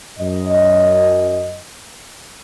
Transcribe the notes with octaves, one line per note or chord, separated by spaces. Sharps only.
F#2 D#5